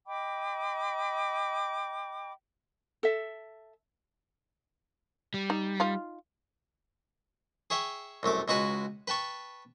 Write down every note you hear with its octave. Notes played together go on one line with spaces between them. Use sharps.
D#5 G5 B5 D6
A4 E5
G3
D#4
D#4 F4 F5
G#4 C#5 E5 G5
C2 F#2 A3 D6
C#2 G#3 F#4 B4 G#5
B4 G5 A5 C#6